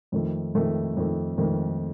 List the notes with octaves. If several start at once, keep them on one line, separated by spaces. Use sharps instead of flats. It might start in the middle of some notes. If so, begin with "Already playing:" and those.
F2 D#3 A3
F2 D#3 A3
F2 D#3 A3
F2 D#3 A3